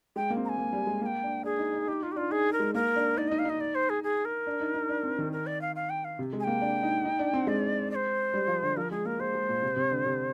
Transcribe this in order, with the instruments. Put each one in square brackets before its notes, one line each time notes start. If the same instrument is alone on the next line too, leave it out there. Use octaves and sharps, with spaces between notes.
[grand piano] G#3 [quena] G5
[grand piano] A#3
C4
[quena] A#5
G#5
[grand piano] A#3
G3
G#3
[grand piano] A#3 [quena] G#5
[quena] G5
[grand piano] D4
[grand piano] D4 [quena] G#4
[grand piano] D#4
D#4
[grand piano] D#4 [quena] G4
[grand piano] D#4 [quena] F4
[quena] G4
[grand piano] D4 [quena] F4
[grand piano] D#4 [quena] G#4
[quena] A#4
[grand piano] G#3
[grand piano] A#3 [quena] A#4
[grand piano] D4
[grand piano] D#4 [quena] D5
[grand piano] D#4 [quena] D#5
[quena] F5
[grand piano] D#4 [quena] D#5
[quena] D5
C5
G#4
G#4
A#4
[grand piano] D4
D#4
D#4
D4
C4
D#3
[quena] A#4
D5
F5
F5
G5
F5
[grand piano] C3
G#3
[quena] G#5
[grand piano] A#3 [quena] G5
[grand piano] D4
D#4
D#4
D4
C4
[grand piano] G#3 [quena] D5
[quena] D5
C5
[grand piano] G3
F3
D3
[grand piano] F3 [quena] A#4
[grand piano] G#3 [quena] G#4
[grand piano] A#3 [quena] A#4
[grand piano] G#3 [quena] C5
[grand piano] G#3
A#2
C3
C3
D3
C3